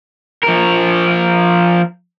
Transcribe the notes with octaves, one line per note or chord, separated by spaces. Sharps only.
F3 A#4